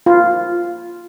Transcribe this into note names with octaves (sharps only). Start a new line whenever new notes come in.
F4